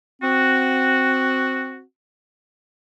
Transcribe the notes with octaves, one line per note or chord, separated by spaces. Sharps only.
C4 F#4